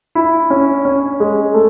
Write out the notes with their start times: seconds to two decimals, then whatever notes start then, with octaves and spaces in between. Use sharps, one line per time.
0.15 E4
0.50 C#4
0.85 C#4
1.20 G#3
1.54 A3